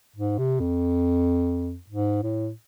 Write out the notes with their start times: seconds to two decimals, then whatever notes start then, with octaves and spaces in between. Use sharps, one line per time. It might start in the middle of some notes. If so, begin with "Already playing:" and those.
0.16 G#2
0.38 C3
0.60 F2
1.89 G#2
2.23 A2